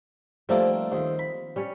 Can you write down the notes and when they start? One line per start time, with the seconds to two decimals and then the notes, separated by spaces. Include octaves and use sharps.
0.49 F3 G3 A3 A#3 C4 D#4
0.92 D#2 C5
1.19 B5
1.56 G3 C#4 C#5